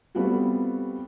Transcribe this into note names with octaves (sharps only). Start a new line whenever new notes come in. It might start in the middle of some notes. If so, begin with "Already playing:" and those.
G3 A3 B3 C4 F4 F#4